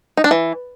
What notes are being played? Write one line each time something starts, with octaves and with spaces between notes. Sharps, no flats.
D#4
D4
E3